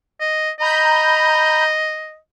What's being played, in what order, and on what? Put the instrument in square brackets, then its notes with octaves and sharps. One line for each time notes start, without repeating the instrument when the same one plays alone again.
[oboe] D#5
[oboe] D#5 [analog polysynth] A#5 B5 G6